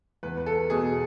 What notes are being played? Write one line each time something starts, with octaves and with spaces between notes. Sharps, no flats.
E2 B4
B4
A4
B2 G#4